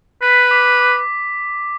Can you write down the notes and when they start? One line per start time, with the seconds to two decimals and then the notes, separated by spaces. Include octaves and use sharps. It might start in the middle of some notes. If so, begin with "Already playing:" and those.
0.22 B4 B6
0.51 D6
0.80 D6